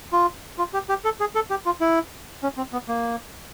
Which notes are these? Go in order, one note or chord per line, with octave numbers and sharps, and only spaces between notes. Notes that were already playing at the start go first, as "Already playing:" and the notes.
F4
F4
G4
G4
A4
G#4
A4
G4
F4
E4
C#4
C4
B3
A#3